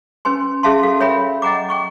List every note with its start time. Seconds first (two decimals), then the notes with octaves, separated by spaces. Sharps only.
0.25 C#4 B4 G#5 C6
0.63 C#4 G#4 E5 F5 A5 C6
0.83 F#4 A4 F5
1.00 A#4 C#5 E5 G5 B5
1.42 D#5 F#5 G5 A#5 D6
1.69 G5 C#6 D6